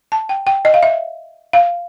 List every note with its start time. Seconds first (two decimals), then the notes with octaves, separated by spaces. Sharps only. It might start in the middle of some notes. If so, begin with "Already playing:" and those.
0.12 A5
0.29 G5
0.47 G5
0.65 D#5
0.74 F5
0.83 E5
1.53 F5